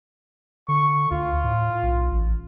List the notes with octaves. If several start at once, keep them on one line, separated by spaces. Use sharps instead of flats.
D3 C#6
D2 F4
A2
B1
A1